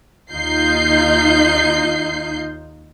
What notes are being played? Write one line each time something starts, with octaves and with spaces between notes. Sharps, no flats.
D#2 D#4 F4 G6 C7